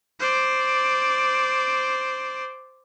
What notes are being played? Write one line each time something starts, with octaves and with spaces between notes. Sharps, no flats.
C5 D5